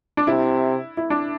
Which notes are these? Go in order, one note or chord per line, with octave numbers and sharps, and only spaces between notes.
D4
C3 E4
E4
D4